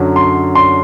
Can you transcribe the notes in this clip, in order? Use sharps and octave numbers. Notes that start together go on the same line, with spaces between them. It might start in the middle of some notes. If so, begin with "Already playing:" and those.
Already playing: F#2 D3 F#3
C6
C6